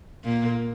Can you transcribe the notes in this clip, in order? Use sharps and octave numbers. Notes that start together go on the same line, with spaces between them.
A#2 A#3